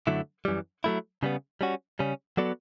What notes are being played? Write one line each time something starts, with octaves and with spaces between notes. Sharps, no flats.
F#2 D3 F#3 A3 E4
F#2 E3 G3
F#3 A3 E4
C#3 G3 B3
G3 C#4 F#4
C#3 G3 C#4
F#3 B3 F#4 A4 D5